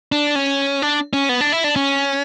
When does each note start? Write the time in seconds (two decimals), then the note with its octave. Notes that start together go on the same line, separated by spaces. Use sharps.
0.12 D4
0.35 C#4
0.82 D4
1.13 C#4
1.29 B3
1.41 D4
1.52 E4
1.64 D4
1.76 C#4